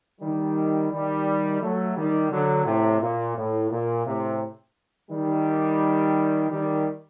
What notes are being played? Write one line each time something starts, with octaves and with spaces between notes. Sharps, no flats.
D#3 G3
D#3 G3
F#3 A3
D#3 G3
D3 F#3
A2 C3
A#2
A2
A#2
A2 C3
D#3 G3
D#3 G3